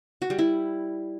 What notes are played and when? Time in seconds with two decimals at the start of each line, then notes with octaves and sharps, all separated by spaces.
0.22 F#4
0.30 G3
0.39 E4